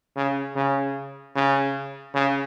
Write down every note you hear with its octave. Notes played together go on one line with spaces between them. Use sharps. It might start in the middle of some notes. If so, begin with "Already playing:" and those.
C#3
C#3
C#3
C#3